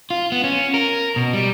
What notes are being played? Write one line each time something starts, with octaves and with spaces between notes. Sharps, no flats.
F4
B3
C#4
A#4
B2
G3